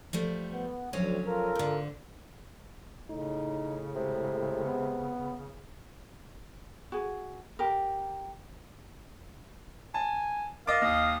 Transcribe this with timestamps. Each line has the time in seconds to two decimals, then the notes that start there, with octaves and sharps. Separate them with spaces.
0.13 F3 G3 A3
0.53 B3
0.93 D2 F3 F#3 C#4
1.26 F4 A4 A#4
1.55 G#2 D3
3.10 A2 C#3 D#4
3.95 C3 G#3
4.65 B3
6.92 F#4 G#4
7.59 G4 A#4
9.94 G#5 A5
10.67 A#4 D#5 F5 D6 A6
10.82 D#2 D#5 D#6